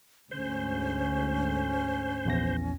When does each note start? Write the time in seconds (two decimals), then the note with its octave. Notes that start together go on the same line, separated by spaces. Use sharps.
0.31 D2 G#2 C#4 C5
2.25 A#1 E2 A#6